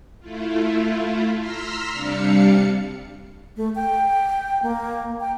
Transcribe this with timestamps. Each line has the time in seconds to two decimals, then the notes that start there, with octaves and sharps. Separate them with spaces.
0.20 A3 E4 F4
1.37 A#5 C6 E6 F6 B6
1.92 C3 G3 D4 F5 C#7
3.57 A3
3.75 G5
4.62 A#3
5.20 G5